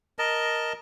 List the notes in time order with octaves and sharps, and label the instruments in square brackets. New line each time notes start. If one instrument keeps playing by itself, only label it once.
[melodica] A#4 D#5 A5